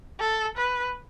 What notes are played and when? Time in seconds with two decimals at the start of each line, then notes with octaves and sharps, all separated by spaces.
0.20 A4
0.57 B4